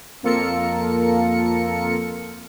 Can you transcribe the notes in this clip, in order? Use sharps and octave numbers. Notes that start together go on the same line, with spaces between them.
F2 A#3 F4 A4 A#4 C#7